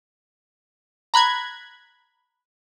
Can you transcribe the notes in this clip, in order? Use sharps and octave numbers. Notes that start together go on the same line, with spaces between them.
A#5 B5 F#6 G#6